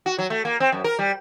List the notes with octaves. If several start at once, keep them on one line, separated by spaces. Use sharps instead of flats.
F#4
F#3
A3
A#3
C4
F#2
A#4
G3